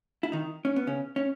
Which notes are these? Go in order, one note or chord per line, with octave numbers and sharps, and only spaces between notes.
E4
D#3 D#4
C#4
B3
C#3 C#4
C#4